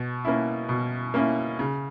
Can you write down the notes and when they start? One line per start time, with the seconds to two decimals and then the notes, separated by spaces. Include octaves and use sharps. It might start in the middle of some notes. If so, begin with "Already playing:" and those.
Already playing: B2
0.25 A#3 C#4 E4
0.69 B2
1.14 A#3 C#4 E4
1.59 C#3